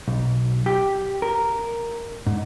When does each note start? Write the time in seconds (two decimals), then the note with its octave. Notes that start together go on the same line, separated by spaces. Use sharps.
0.08 B1
0.66 G4
1.22 A#4
2.27 G#2